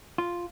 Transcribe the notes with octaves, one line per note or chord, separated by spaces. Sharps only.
F4